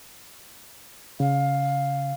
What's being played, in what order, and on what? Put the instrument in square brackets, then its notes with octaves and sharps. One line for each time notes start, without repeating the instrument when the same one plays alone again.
[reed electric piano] C#3 [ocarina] F5